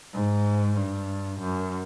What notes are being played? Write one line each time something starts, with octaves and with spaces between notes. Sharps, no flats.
G#2
G2
F#2